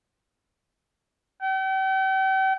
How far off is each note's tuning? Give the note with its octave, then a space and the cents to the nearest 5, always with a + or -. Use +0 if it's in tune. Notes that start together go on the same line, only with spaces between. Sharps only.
G5 -40